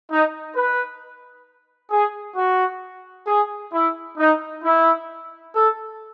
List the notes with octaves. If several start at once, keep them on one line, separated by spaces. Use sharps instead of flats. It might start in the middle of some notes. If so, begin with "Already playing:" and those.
D#4
B4
G#4
F#4
G#4
E4
D#4
E4
A4